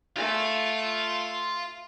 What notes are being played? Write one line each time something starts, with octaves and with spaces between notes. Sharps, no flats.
A3 F4